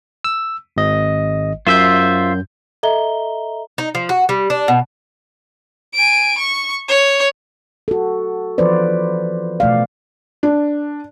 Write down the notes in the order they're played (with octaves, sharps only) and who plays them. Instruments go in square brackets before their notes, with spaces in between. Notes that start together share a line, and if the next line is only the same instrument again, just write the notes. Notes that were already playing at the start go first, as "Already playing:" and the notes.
[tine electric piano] E6
G#1 D#5
[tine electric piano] F#2 G6 [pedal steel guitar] F4 C5 E5
[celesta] A4 D#5 E5 A#5 G7
[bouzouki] D#4
F3
F#4
G3
D4
B2
[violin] G#5 D7
C#6
C#5
[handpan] F#4 A4
E3 F3 F4 B4 C5 D5
B2 A3 D5 F5
[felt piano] D4